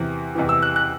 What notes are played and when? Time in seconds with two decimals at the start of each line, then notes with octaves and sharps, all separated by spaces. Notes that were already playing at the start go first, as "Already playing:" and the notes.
Already playing: E2 C3 E3
0.35 E2 C3 E3
0.49 E6
0.62 F#6
0.76 F#6